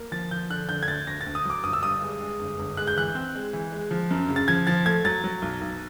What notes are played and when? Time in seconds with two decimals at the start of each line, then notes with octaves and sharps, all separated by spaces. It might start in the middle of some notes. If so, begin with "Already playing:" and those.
Already playing: A#3
0.12 F3 A6
0.31 F3 G6
0.50 D3 F#6
0.69 D3 G6
0.83 G#6
0.88 D2 A6
1.07 D2 A#6
1.21 A6
1.26 D2
1.35 D#6
1.45 F#3 D6
1.64 G1 D#6
1.73 E6
1.82 G2 D#6
2.01 G#3
2.21 G#3
2.39 G1
2.59 G1
2.77 G#3 F#6
2.87 G6
2.97 E3 F#6
3.15 C4
3.35 G#3
3.53 E3
3.72 G#3
3.91 F3
4.11 F#2
4.29 C#3
4.36 A6
4.48 F3 G#6
4.67 F3 A6
4.85 A3 G#6
5.05 F#3 A6
5.24 F#3
5.42 B1
5.61 B1